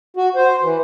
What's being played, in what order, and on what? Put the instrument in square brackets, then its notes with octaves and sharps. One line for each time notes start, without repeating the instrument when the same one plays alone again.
[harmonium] F#4
C5
E3